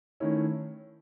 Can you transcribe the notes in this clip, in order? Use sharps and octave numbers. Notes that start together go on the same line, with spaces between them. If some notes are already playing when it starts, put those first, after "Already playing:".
D#3 A3 C#4 E4